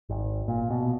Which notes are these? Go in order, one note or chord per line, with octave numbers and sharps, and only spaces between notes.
G#1
A#2
B2